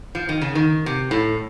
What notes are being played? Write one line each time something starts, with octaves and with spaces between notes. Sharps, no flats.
F3
D#3
C#3
D#3
C3
A2